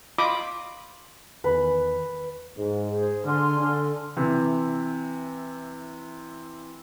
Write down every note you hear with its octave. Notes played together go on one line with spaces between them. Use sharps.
F4 D#5 B5 D6 D#6
E2 D#3 B4
G#2
G#4 C5
D3 G#5 C6 F6
D3
C3 E3